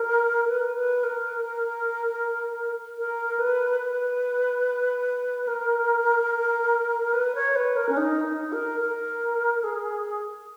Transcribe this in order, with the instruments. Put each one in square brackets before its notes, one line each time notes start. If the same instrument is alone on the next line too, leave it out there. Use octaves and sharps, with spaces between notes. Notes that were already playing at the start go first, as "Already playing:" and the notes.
Already playing: [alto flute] A#4
B4
B4
A#4
A#4
B4
B4
A#4
B4
C#5
B4
A#4
C#4
D#4
D#4
A#4
A#4
G#4